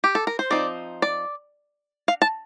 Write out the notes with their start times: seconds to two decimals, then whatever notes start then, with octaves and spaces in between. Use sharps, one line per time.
0.04 G4
0.15 A4
0.27 A#4
0.39 C5
0.50 F3 C4 D#4 D5
1.02 D5
2.08 F5
2.22 A5